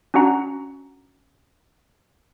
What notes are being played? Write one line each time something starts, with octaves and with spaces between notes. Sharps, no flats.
C#4 D4 F#4 F#5 A#5